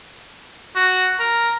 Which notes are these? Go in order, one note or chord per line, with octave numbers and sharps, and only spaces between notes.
F#4
A#4